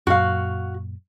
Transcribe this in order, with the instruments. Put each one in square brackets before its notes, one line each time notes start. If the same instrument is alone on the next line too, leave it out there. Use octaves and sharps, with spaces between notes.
[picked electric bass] F#2 A#2 [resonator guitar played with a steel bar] F#4 F5